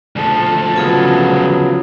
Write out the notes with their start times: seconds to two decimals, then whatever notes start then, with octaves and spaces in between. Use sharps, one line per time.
0.16 D2 F3 A4
0.76 C#3 F#3 B3 F4 G#4